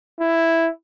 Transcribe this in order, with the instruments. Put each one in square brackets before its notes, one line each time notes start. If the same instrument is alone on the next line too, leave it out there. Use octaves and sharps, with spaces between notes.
[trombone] E4